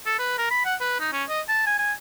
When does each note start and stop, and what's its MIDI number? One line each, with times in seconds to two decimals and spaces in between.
0.06 0.18 69
0.19 0.35 71
0.38 0.48 70
0.51 0.64 83
0.65 0.75 78
0.81 0.98 71
1.00 1.10 63
1.12 1.23 61
1.29 1.41 75
1.48 1.66 81
1.66 1.75 80
1.78 1.92 80